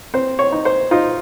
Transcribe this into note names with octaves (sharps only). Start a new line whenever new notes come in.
C4 C5
C#5
D#4
C5
D#4 F4